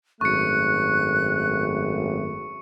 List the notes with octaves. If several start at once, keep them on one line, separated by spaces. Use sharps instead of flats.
G#1 F#2 A3 C#6 F#6 C#7